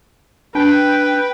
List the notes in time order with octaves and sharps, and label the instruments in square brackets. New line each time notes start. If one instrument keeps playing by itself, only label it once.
[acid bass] D4 [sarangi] B4 [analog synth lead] G5